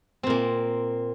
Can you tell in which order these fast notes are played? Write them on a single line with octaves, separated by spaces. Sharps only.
C4 A#2 A#3